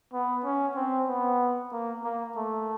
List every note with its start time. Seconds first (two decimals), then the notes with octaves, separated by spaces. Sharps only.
0.13 B3
0.45 C#4
0.76 C4
1.09 B3
1.72 A#3
2.04 A#3
2.36 A3